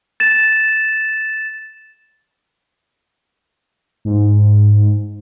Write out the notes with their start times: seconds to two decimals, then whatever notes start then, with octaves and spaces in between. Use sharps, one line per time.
0.20 A6 E7
4.05 G#2